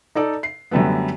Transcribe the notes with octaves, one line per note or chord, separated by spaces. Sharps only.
D#4 A4 D5
C7
F#2 D3 G3 A3 B3